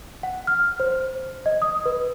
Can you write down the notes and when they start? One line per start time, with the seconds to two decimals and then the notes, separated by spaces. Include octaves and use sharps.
0.23 F#5
0.47 F6
0.80 C5
1.46 D#5
1.62 D#6
1.86 B4